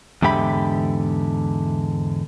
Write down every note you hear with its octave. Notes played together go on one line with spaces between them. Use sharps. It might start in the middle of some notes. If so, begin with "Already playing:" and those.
E2 G#2 D3 G4 E5 B5